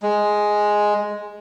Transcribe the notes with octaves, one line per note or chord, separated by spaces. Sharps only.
G#3